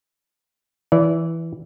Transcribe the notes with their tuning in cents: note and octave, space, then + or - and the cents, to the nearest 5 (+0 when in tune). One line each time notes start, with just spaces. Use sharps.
E3 +0 D5 -25